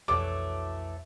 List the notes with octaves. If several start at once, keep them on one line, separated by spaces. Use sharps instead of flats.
B1 F2 E3 F#3 A3 D6 A6